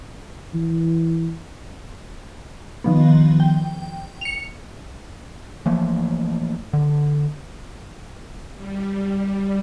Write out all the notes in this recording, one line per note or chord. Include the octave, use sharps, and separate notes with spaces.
E3
D#3 F3 B3
G5
C#7 F7
E3 F3 A3 A#3
D3
G3